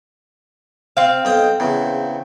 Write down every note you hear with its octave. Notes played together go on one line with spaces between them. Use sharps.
C4 F5
B1 D#5 G5
E2 C#3